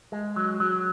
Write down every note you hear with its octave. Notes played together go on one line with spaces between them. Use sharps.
G#3
F#3
F#3